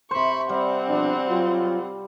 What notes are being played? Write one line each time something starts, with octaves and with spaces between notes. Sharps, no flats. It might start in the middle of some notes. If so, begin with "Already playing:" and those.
C3 C5 B5 C#6
G3 C4 F#5
B2 F3 D4
F#3 F4